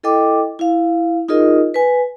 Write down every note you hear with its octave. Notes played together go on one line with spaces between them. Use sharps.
E4 A4 D#5 G5 D6
E4 F5
D#4 F4 G#4 A#4 D#5
B4 G#5